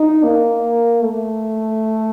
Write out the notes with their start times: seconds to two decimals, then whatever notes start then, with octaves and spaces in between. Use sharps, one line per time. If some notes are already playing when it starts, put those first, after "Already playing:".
Already playing: D#4
0.23 A#3
1.03 A3